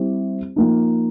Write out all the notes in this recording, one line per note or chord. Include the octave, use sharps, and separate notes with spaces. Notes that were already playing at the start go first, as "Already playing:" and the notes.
Already playing: G3 C4 E4 G4
F3 A#3 D#4